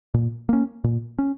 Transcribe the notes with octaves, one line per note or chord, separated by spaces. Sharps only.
A#2
A#3 C#4
A#2
C#4